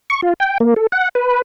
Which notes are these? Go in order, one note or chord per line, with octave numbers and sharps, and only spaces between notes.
C#6
F4
G5
A#3
A4
F#5
B4